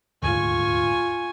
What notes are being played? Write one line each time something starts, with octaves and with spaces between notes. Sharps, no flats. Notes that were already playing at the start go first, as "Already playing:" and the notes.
D#1 D2 G#2 F4 G#5 C#6